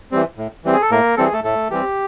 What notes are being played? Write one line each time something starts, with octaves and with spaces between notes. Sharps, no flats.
E3 G3 C4
A2
E3 G3 C4
G#4
A4
A2 A#3 A#4
E3 G3 C4 A4
G#4
A3 A4
A2 A3 A4
E3 G3 C4 G4